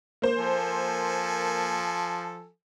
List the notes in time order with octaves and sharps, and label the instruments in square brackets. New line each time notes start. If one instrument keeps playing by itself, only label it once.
[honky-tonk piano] A#3 C5
[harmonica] F3 A4 G#5